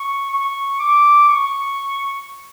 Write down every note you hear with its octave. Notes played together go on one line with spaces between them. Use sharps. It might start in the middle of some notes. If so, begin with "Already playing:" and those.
Already playing: C#6
C#6
D6
C#6